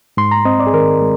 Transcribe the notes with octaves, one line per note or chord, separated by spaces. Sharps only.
G#2 C6
A#5
C4 D#5
D5
G#4
D#3 A#4
G#3